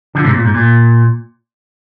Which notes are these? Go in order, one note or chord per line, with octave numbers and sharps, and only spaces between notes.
D3 F3
G#2 C3
A#2
G#2
A#2